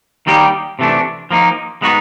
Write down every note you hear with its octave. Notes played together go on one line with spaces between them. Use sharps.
D#3 G3 A#3 D#4 G4
C3 E3 A3 D4
F3 A#3 D#4
G#3 B3 D#4 F#4